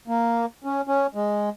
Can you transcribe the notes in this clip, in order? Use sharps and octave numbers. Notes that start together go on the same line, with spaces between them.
A#3
C#4
C#4
G#3